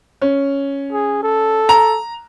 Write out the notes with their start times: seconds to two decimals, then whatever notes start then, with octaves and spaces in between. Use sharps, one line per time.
0.21 C#4
0.92 G#4
1.23 A4
1.69 A#5